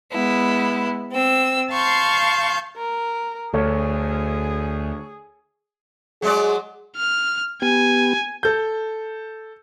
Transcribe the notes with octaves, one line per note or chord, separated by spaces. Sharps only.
G#3 B3 E4
C4 E6
F5 A5 C6 C#6 G6
A#4
D2 G#4 A4 C#5
F#3 G#3 G#4 D5
F6
B3 G4 G#5
A4 G6